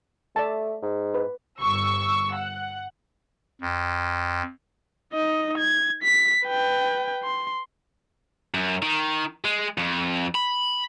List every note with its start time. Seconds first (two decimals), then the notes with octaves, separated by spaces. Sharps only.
0.36 A3 D5 E5 A5
0.82 G#2
1.14 B4
1.60 G1 C#6 E6
2.35 F#5
3.61 F2
5.13 D#4 D#5
5.58 G#6
6.03 B6
6.44 B4 G5
7.24 C6
8.54 F#2
8.83 D#3
9.45 G#3
9.78 F2
10.35 B5